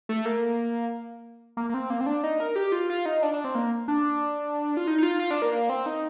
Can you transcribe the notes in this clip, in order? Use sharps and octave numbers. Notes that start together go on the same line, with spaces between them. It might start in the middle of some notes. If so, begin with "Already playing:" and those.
A3
A#3
A#3
A#3
C4
A#3
C4
D4
D#4
A#4
G4
F4
F4
D#4
D4
D4
C4
A#3
D4
F4
D#4
D#4
F4
F4
D4
A#3
A#3
C4
D#4